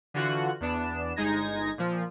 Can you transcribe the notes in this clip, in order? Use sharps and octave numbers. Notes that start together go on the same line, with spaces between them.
D3 E3 F4 F#4 F#6
E2 B3 D4 E7
G1 G#3 D#4 G#6 A#6
A#2 F3